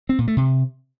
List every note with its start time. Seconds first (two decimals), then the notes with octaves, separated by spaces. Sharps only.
0.09 C4
0.18 A#2
0.28 A3
0.37 C3